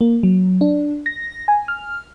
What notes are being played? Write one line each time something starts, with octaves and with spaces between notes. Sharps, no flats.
A#3
F#3
D4
A#6
G#5
F6